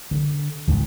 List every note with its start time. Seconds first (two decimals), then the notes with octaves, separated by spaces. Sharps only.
0.11 D3
0.67 D#2 G#2 C#3 F3